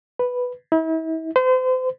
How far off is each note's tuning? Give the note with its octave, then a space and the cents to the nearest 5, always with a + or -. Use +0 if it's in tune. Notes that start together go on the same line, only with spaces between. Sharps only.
B4 +0
E4 -40
C5 -35